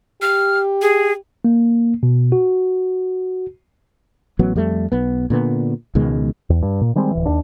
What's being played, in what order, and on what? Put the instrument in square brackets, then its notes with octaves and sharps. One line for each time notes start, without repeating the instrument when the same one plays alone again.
[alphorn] G4 [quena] F6
[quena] G#4
[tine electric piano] A#3
B2
F#4
[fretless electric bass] A1 F#3 B3
F2 G3 A3
B1 B3
A#2 D3 B3
C#2 B2 D#3 G#3
[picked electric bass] E2
G2
A#2
D#3 G3 G#3 C4
D1 E3
D#2 D4